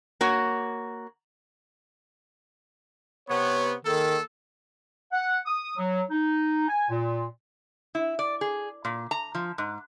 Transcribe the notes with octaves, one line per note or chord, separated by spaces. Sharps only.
A#3 F#4 C#5
C3 B3 C#5
D#3 A#3 G#4 A4
F#5
D#6
F#3
D#4
G#5
A#2
E4
D5
G#4
A#2
A#5
F3
G#2